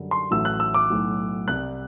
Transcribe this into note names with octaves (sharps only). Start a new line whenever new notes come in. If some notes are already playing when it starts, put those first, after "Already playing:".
Already playing: F#2 D3 G3
C6
A1 A2 F#3 A3 E6
F#6
E6
D6
B1 A2 F#3
C2 C3 G3 F#6